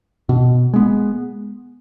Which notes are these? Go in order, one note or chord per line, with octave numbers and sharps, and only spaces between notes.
B2
G#3 B3